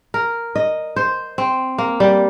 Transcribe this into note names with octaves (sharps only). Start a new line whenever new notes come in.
A#4
D#5
C5
C4
A#3
G3